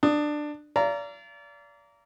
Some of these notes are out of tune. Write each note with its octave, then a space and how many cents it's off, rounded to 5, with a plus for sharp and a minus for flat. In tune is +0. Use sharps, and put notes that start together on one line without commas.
D4 +15 D#6 +0
D5 -30 F5 -40 A#5 -5